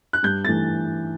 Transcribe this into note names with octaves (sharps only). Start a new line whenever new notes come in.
F#6
G2 G6
E3 A3 A6